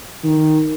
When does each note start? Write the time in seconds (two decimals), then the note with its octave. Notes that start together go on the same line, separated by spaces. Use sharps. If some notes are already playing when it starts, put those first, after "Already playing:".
0.24 D#3